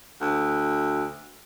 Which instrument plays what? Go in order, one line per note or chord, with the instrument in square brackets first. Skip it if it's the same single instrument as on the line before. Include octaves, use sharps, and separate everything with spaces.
[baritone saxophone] D2